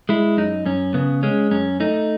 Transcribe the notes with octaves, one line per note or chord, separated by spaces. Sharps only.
G#3 E4
F#2 D#4
F#2 C#4
C#3 B3
G#3 C#4
F#2 C#4
A3 D#4